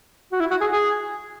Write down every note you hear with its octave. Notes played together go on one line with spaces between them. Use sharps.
F#4
E4
F#4
G#4
G#4